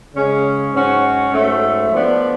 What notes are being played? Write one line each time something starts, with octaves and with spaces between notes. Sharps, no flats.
C#3 G#3 C#4
G#2 F#3 C#4 F#4
G#2 F#3 A3
F3 B3 D4